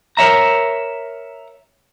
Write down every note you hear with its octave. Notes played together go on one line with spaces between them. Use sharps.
A#4 C#5 E5 A#5